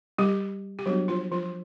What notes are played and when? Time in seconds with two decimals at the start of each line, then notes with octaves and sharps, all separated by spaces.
0.18 G3 G4
0.79 G4
0.86 F#3 G3 B3 D4 F#4
1.08 F3 F4
1.31 F3 F4